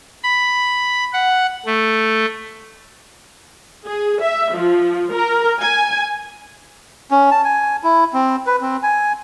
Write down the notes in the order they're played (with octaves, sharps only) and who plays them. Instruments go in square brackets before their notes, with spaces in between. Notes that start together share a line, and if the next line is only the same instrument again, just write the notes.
[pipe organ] B5
F#5
A3
[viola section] G#4
E5
F3
A#4
G#5
[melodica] C#4
A5
G#5
E4
C4
B4
C4
G#5